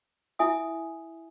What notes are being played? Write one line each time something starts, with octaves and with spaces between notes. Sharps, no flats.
E4 E5 G#5 D#6